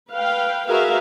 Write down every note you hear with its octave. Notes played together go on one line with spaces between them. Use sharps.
B4 F5 G5
F#4 G#4 A#4 B4 E5 F5